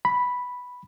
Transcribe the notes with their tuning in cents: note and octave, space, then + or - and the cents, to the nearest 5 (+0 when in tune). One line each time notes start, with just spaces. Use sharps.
B5 +0